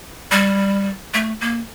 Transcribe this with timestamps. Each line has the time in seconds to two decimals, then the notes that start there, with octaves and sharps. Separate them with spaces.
0.32 G3
1.14 A3
1.41 A#3